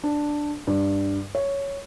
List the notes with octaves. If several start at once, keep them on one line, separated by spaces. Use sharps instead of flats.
D4
G2
C#5